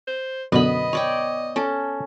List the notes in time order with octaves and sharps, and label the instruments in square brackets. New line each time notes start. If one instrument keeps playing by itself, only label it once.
[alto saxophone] C5
[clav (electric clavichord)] F#2 B2 D3 [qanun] B3 B5 [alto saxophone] D#5
[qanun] C#5 D5 G5
C#4 A4